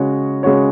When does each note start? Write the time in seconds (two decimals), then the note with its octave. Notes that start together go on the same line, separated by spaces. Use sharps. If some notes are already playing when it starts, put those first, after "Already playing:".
Already playing: C#3 G#3 C#4 F#4 C#5
0.43 C#3 G#3 C#4 F#4 C#5